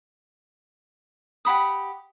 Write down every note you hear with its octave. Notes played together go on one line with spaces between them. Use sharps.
G4 F#5 B5 D#6